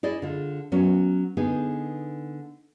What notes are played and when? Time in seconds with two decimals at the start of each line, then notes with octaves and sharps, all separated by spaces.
0.03 E4 G#4 D5 D#5
0.22 D3 F4
0.72 F#3 B3 C#4
1.37 D3 B3 D#4 G#4